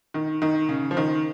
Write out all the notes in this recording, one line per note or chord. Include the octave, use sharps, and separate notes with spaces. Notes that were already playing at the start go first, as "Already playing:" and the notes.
D#3
D#3
C#3
F3
D#3